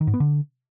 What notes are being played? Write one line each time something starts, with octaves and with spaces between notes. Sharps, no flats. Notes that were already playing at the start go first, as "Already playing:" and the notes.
D#3
G#2
B3
D3